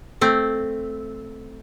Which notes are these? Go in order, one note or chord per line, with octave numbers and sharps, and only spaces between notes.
A3 C4